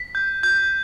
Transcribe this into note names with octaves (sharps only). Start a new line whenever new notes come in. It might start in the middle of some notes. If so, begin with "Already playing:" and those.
Already playing: B6
G6
G6